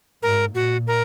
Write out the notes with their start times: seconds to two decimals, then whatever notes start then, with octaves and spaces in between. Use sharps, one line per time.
0.23 G#2 A#4
0.55 A#2 F#4
0.87 A#4